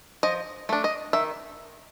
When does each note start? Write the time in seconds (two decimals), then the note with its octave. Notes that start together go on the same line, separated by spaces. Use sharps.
0.23 F3 D#5
0.69 A3 D4
0.84 D#5
1.13 D#3 E5